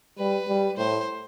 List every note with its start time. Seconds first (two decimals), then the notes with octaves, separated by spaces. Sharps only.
0.18 G3 B4
0.48 G3
0.77 A2 C5